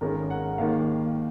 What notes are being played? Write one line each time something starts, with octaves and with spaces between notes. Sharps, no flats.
G#1 G#2 D#3 G#3 C#4 A#4
F#5
D#2 D#3 A#3 F5